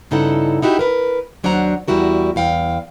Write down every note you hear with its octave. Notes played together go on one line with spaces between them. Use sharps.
G2 C#3 D#4 E4 A4 F#5
D#4 E4 F#4 G4
A#4 B4
D#2 F#3 D4 C5 F#5 A#5
E2 G3 E4 F#4 A#4
E2 F5 G5